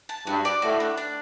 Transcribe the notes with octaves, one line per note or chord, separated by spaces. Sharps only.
A5
G2 F#4
D5
A2 F#4
D4
D4